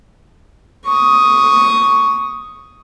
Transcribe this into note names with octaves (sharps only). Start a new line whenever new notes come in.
C#6 D#6